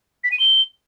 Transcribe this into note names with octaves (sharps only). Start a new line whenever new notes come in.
B6
D#7
G7